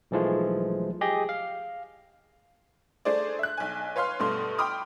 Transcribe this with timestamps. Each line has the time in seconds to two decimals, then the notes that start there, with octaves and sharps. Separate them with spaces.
0.11 B1 E3 F3 G#3 A3
1.01 G4 G#4 D#5 G5
1.29 F5
3.05 A3 D4 G#4 C5 D5
3.39 E5 F#6
3.57 B1 G#5
3.96 B4 C#5 F5 C6 F6
4.19 G2 B2 A3 C6 F6
4.58 G5 B5 C6 D6 D#6 F6